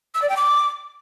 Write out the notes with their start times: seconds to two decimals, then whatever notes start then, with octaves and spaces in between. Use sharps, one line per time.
0.15 E6
0.22 D5
0.29 G5
0.37 D6